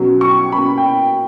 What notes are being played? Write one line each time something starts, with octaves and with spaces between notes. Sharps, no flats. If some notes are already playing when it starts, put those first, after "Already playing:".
Already playing: B2 F#3 C#4
C#6
B2 A#3 C#4 B5
G5